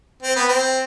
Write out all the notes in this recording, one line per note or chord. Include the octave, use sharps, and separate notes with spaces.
C4
B3
C4